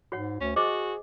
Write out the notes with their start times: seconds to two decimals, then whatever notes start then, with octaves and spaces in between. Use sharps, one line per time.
0.12 G#2 F#4 C#5 F#5
0.41 D2 C#4
0.56 F#4 G#4 C5 D#5 D6